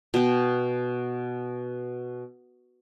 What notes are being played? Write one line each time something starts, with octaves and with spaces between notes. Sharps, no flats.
B2 G5